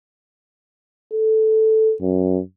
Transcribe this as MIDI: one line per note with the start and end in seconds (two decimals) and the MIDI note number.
1.13 1.94 69
2.01 2.40 42